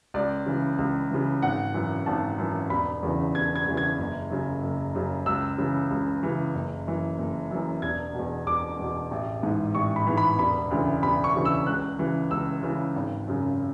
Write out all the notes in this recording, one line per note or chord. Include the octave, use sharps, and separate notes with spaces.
C#2 D5
C#3 E3
C#2
C#3 E3
G#1 F#5
F#2 E3
G#1 A5
F#2 E3
E1 B5
E2 C#3 E3
E1 G#6
G#6
E2 C#3 E3
G#6
F#1
F#2 C#3
F#1
F#2 C#3
C#2 E6
C#3 E3
C#2
C#3 E3
F#1
F#2 E3
F#1
F#2 E3
E1 G#6
E2 B2
E1 D6
E2 B2
A1
G#2 E3
A1 C#6
B5
G#2 E3
B5
E1 B5
D2 C#3 E3
E1 B5
C#6
D2 C#3 E3
E6
C#2 F#6
C#3 E3
C#2 E6
C#3 E3
G#1
F#2 C#3